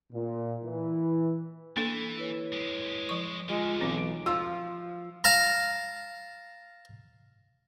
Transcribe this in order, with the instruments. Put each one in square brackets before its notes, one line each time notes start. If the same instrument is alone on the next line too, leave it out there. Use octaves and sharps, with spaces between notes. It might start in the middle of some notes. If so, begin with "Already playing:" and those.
[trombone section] A#2
E3
[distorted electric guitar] E3 [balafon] A#3 D4 A4
[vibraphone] E4 B4 C#5
[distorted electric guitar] G#3 G4
[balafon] F3 C#6
[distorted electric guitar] D3 D#3 [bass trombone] G#3 [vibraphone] F4 G#4 D#5
[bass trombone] B1 [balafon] E3 C4 [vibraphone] D6
[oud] F3 F4 [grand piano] E6
[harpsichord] F5 A5 A#5